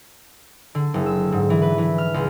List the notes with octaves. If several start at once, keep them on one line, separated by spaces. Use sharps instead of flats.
D3
F#1
E6
G#2
E3
B4
E3
F6
C#2